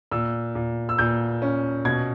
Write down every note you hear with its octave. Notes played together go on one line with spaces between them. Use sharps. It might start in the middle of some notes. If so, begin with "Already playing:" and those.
A#2 E6
A#2
E6
A#2 G6
C#4
B2 G#6